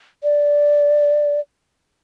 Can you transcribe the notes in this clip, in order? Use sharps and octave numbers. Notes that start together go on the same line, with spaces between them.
D5